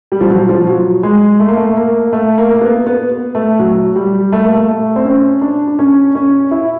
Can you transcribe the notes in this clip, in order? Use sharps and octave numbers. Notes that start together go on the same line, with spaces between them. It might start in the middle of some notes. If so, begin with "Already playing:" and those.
G3
F3
F#3
F3
F#3
G#3
A3
A#3
A3
A#3
A3
A#3
A#3
B3
B3
A3
F#3
G3
A3
A#3
A3
A3
C4
C#4
D4
D4
C#4
C#4
E4